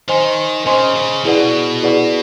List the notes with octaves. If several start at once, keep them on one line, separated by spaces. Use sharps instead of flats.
D#3 C5 D#5 G#5 C6
C#3 C5 D#5 G#5 C6
C#3
B2 E4 G#4 B4 D5 F#5
E4 G#4 B4 D5 F#5